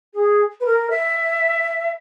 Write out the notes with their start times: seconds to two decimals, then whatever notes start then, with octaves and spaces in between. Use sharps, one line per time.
0.13 G#4
0.60 B4
0.65 A#4
0.90 E5